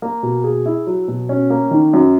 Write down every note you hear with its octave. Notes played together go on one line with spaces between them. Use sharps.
A#3
B2
G#4
E4
F#3
B2
C#4
A#3
D#3
F#2